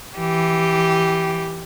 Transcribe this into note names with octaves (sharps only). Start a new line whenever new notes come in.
E3 G4